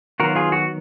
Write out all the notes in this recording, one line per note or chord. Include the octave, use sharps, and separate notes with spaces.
D#3 F#3 B3 F4 F#4 A#4
F4 G#4
F#4